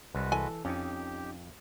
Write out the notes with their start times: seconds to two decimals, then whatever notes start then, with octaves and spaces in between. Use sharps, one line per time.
0.15 C2 G#3 F#4 B4
0.32 E3 A4 G#5
0.65 F2 C#4 D#4 G4